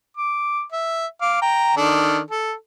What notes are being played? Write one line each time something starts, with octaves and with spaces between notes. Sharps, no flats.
D6
E5
F5 D6
G5 A#5
D#3 D4 A4
A4